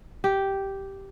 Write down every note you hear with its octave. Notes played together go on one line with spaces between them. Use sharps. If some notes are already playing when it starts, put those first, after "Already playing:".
G4